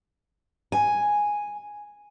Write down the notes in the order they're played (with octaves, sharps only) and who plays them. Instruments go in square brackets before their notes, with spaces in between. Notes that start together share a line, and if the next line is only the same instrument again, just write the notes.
[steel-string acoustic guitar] G#5